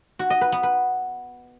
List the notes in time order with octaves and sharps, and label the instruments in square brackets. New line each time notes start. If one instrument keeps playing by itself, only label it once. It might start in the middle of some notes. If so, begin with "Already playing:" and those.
[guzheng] F#4
D#5
B4
B3
B4